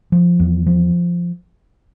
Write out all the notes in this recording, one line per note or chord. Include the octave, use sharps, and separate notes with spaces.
F3
E2
F3